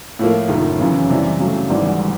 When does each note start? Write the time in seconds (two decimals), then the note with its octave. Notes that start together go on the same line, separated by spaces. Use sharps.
0.19 A2 F3 A#3
0.48 F#1 F#2 D#3
0.80 F#2 C#3 E3
1.10 C3 E3 G3
1.39 C#3 F#3 A3
1.69 G#1 G#2 E3 G3